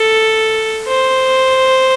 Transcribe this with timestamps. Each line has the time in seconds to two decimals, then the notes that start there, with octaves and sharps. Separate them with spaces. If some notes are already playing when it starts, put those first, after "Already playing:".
Already playing: A4
0.88 C5